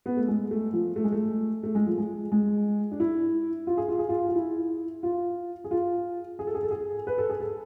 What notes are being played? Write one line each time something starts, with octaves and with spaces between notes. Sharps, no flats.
B3
A3
G#3
A3
F3
A3
G#3
A3
A3
G#3
F3
G#3
G#3
D4
E4
F4
G#4
F4
G#4
F4
F4
E4
F4
G#4
F4
G#4
A4
G#4
A4
G#4
B4
A4
G#4
A4